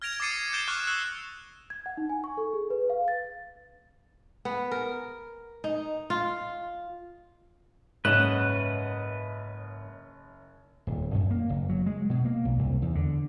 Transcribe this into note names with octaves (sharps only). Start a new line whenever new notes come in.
F6 G#6 A#6 D7 F7
D6 D#6 A6 C7 C#7 D#7
C#7
G6 A6 C7 D7 E7 G7
C#6 D6 F6 F#6
E6 F#6 C#7
G#6
F#5
D#4
G#5
C#6
A4
G#4
B4
F5
A6
B3
A#4
D#4
F4
F#1 G#2 C#4 B4 D#5 F#5 F#6 E7
D#1
F#2
A#3
F#1
F#3
G#3
B2
A#3
B1
C2
E2
D3